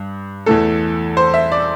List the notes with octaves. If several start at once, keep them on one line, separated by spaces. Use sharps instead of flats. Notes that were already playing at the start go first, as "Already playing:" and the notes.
Already playing: G2
E2 E3 A3 A4
C5
E5
D5